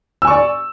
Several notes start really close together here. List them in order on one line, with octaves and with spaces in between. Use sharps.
E6 G#5 C#6 D5